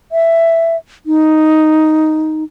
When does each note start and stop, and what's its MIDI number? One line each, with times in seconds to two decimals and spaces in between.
0.12 0.76 76
1.06 2.44 63